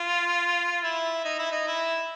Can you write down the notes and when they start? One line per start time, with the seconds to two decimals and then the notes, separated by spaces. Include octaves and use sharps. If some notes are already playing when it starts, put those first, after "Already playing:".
Already playing: F4
0.83 E4
1.25 D#4
1.39 E4
1.52 D#4
1.67 E4